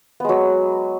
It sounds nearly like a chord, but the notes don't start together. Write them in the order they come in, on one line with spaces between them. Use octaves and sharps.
B3 G#3 F#3